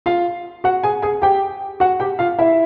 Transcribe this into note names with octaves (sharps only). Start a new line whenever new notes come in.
F4 F5
F#4 F#5
G#4 G#5
G#4 G#5
G4 G5
F#4 F#5
G4 G5
F4 F5
E4 E5